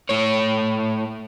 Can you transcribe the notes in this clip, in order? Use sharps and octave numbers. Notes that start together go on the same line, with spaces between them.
A2 C#5